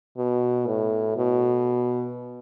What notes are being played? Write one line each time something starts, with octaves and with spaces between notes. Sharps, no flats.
B2
A2
B2